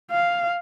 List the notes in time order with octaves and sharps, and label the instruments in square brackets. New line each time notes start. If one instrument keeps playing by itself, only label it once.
[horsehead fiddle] F5